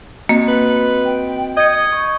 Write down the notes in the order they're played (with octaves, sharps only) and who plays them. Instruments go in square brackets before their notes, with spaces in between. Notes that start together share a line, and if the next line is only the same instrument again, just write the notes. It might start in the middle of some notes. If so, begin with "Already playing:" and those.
[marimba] A#3 [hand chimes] C4 F#4 D#5
[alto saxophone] B4
[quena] G5
[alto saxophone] D#5 [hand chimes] G6 C#7 [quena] G#6
[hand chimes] C#6